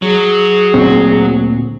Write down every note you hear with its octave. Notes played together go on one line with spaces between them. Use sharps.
F#3 G#4
D2 A#2 C4